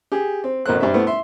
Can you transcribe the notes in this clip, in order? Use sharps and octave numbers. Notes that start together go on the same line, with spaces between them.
G4 G#4
C4
A1 B2 A#4 C5 F#6
G2 G3 C4 E5
A3 B3 C4 E4
E5 C6